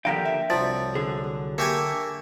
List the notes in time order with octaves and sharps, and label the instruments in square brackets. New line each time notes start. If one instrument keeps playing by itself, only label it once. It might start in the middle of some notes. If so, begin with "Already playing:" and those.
[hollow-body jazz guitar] D#2 F3 F5 [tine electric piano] D3 [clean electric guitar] G4 A#4 G5
[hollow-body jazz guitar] E5
[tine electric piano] C2 F#3 [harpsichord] F3 [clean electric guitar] D5
[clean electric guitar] D3 [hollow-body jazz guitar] G#4
[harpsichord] A#3 G4 G#5 [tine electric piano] E5 A5 C#6